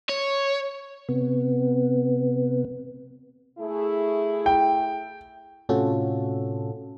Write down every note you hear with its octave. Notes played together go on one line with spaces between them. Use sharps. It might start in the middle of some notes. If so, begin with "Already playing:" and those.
C#5
C3 B3
A3 E4 G#4
G5
A2 C3 C#4 F4 F#4 A4